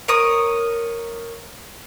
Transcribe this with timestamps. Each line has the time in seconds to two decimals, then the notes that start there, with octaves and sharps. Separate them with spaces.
0.08 A#4 C#5 D#6